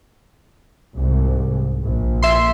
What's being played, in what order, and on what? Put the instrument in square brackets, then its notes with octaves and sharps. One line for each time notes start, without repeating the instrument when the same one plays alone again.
[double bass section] C2 G#2
A#1
[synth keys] E5 C6